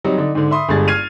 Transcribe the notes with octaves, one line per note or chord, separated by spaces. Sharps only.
F#3 G3 C4 D#4
D3 D4 D#4
G#2 D3
E5 B5 C6 D#6
G1 G2 G#3 G#4 A6
F6 G#6 C7 D#7 F7